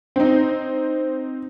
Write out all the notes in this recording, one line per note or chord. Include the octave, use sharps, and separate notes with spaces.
C4 D#4